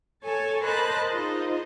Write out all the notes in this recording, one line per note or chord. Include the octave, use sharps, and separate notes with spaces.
A4 C#5 G#5 A5
A#4 C5 D#5 A5 B5 F#6
D#4 F4 G#4 C5 D#5